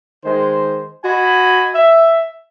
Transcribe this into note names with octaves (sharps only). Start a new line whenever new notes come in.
D#3 G#3 C5
F#4 D#5 G#5 B5
E5